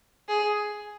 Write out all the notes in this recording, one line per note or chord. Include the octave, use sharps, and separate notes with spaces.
G#4